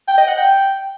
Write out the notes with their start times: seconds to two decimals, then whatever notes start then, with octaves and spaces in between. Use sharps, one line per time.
0.08 G5
0.18 D#5
0.27 F#5
0.37 G5